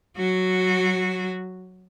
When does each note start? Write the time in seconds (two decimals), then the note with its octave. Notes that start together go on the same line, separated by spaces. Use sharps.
0.17 F#3 F#4